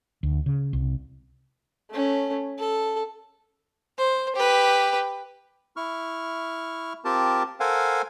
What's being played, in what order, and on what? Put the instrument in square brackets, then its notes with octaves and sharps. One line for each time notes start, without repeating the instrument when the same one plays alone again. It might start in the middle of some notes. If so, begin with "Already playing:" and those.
[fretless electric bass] D2
C#3
C2
[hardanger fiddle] A3 C#4
A4
[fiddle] C5
G4 B4
[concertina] E4 C#6 F6
C4 F4 G4 A#4 A5
A4 A#4 C5 F5 F#5 G#5